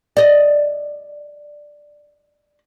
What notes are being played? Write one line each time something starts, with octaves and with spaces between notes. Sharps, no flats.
D5 D#5